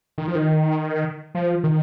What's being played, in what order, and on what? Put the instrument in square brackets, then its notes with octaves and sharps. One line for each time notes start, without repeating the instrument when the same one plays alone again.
[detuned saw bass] D#3
F3
D#3
F3
D#3